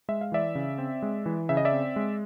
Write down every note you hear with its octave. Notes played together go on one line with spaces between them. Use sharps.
G#3 E5
F5
E3 D5 E5
C#3
C4
G#3
E3
C#3 E5
D#5
D5 E5
C4
G#3